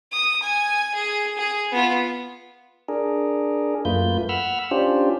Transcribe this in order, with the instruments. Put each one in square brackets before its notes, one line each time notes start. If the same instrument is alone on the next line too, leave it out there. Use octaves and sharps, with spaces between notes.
[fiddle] D#6
G#5
G#4
G#4
B3 F4
[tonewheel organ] D4 G#4 A#4
F#2 A3 A#3 F4 B4 G6
F#5 B5 E6 F6
C#4 D4 F4 G4 C5